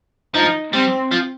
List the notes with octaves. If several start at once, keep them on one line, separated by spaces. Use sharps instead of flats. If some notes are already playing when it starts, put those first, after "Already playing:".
F3 D#4
G3 C4
F3